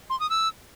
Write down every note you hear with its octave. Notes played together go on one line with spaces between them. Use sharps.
C6
D#6
E6